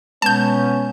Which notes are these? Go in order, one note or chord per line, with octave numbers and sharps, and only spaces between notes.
B2 G#3 B3 C#4 A5 G6